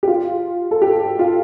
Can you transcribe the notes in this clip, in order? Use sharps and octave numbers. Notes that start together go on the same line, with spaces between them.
G4
F4
A4
G4
F4